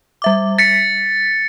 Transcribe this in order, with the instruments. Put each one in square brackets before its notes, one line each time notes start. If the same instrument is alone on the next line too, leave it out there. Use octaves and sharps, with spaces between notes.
[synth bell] G3 E5 D6
[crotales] A6 C#7 [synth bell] B6